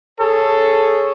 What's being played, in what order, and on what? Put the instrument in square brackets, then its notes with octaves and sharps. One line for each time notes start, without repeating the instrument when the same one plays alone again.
[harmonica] G#4 C#5 [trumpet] A4